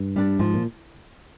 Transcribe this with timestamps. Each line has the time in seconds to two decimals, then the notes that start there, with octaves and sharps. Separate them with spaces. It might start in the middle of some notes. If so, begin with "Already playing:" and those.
Already playing: G2
0.16 G3 D4
0.39 G#2 F3
0.54 A#2